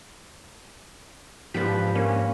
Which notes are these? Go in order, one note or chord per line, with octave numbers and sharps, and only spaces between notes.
G#2 F3 D4 G4 B4 B6
A#3 C#4